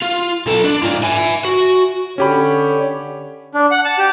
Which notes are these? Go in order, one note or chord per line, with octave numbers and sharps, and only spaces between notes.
F4
B1 A4
D4
G#2 F4
E5 G#5
F#4
D3 C#4 G4 C#5 B5
D4
F#5
A5
G4